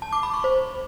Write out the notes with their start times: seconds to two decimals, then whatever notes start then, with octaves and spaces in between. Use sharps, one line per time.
0.02 A5
0.13 D6
0.23 B5
0.33 C#6
0.44 C5